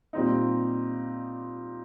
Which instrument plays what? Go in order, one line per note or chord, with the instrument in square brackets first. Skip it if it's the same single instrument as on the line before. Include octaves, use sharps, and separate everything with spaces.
[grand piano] A#2 G3 C4 D#4